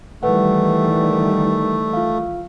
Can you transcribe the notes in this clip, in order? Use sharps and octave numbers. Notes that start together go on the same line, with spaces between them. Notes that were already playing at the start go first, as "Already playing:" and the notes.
D#3 E3 G3 A3 B4 F#5
F4 F5